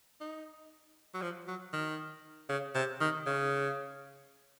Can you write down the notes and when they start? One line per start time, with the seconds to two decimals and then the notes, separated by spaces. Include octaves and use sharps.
0.21 D#4
1.14 F#3
1.22 F3
1.48 F#3
1.73 D#3
2.50 C#3
2.75 C3
3.01 D#3
3.26 C#3